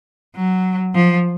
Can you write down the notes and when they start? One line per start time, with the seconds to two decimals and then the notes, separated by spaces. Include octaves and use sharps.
0.36 F#3
0.95 F3